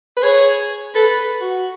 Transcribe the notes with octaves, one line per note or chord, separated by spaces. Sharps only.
B4
G#4 C#5
A4 B4
F#4